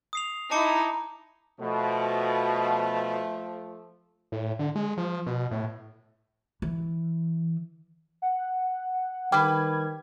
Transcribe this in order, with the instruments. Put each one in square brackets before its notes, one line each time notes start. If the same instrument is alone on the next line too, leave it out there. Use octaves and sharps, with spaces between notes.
[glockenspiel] D#6 C7 F7
[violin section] D#4 E4 [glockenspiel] A5 D6 C#7
[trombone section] B2 [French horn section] F3 A3
[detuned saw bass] A2
D3
G#3
F3
B2
A2
[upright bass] E3
[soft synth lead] F#5
[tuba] D#3 [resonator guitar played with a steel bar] G3 B4 [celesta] G5 D6 [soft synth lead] G#6